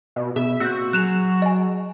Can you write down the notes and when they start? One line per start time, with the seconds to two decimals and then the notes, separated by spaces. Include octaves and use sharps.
0.16 B2
0.36 B2 G#4 E5
0.60 A#2 C4 F#4 E6 G6
0.93 F#3 G#4 F#6 E7 F7
1.42 D#5 G#5